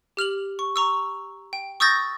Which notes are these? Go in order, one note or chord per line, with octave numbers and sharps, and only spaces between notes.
G4 F6 F7 F#7
C#6
A#5 C#6 E6
G5
C#6 D#6 E6 G6 A6 A#6